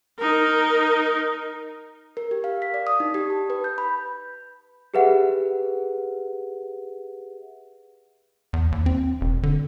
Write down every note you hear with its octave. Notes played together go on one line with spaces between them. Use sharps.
D#4 A#4
A#4
G4
F5
B6
D5
D#6
D#4
G4
A5
B4
G6
B5
G4 G#4 B4 E5 F#5
E2
D#2
C4
E1
D3